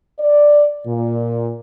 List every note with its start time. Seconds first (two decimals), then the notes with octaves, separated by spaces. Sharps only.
0.19 D5
0.87 A#2